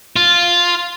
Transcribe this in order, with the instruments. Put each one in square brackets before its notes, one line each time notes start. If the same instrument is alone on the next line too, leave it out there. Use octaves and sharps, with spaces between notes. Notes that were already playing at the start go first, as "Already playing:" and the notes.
[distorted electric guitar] F4